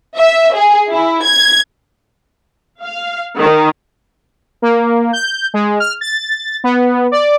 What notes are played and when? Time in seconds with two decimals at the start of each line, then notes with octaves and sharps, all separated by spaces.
0.18 E5
0.55 G#4
0.89 E4
1.24 G#6
2.81 F5
3.37 D#3
4.62 A#3
5.13 G6
5.54 G#3
5.80 F6
6.01 A6
6.64 B3
7.12 D5